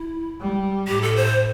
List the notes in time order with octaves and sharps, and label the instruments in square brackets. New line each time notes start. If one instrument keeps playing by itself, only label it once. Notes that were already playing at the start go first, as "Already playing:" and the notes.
Already playing: [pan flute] E4
[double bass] G3
[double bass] A2 [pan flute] G4
[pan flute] A4
C5